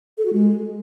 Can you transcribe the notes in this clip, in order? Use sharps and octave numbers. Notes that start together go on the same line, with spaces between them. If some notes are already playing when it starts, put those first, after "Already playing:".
A4
F#4
G#3